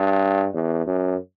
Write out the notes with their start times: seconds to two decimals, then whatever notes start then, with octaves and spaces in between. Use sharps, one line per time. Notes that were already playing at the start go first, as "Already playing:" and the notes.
Already playing: G2
0.54 E2
0.87 F#2